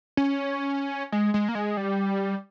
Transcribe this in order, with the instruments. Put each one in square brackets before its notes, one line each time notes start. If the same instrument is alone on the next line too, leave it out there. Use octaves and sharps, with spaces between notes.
[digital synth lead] C#4
G#3
G#3
A#3
G#3
G3